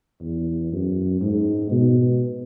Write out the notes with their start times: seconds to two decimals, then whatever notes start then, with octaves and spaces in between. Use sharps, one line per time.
0.21 E2
0.72 F#2
1.21 G#2
1.71 B2